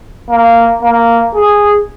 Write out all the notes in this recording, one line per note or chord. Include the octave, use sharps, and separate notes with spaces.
A#3
A#3
G#4